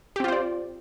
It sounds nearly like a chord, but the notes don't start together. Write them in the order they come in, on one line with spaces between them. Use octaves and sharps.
G4 C4 F4 C5 D5